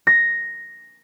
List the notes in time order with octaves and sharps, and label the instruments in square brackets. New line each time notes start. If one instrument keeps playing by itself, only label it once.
[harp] A#6